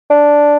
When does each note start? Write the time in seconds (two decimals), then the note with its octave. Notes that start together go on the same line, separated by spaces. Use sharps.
0.10 D4